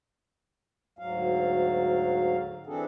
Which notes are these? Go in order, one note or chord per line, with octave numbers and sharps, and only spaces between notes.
D2 G#2 F#3 F5
E3 C4 D4 G#4 A4